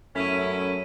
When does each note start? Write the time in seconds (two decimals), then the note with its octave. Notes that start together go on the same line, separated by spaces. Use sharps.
0.16 F#2 A3 C#4 E4 B6 D#7